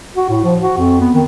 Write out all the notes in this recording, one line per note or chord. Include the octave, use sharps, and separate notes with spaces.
F#4
A2
F3
F#4
F2
B3
D#3